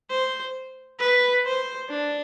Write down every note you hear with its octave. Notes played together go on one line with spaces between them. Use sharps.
C5
B4
C5
D4